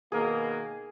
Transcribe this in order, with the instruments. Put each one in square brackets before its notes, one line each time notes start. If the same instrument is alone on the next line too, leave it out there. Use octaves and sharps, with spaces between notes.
[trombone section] B2 D#3 A#3 [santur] G#4